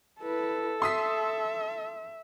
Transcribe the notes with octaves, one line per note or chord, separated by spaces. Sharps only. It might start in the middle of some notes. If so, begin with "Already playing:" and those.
E4 A4 B4
E5 C6 D#6 B6